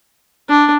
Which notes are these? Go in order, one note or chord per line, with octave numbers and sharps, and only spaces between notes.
D4